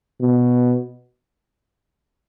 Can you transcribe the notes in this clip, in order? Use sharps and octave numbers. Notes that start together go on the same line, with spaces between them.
B2